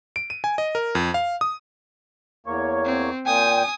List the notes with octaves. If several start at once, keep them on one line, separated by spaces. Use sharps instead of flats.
D7
D#7
G#5
D#5
A#4
F2
F5
D#6
E2 A#3 C#5
C4
A#2 G5 G#5 D#6